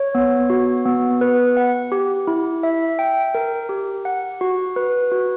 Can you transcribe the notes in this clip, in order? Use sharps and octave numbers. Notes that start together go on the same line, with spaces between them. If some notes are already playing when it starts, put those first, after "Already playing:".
Already playing: C#5
B3
F#4
B3
B4
F#5
G4
E4
E5
G5
A#4
G4
F#5
F#4
B4
F#4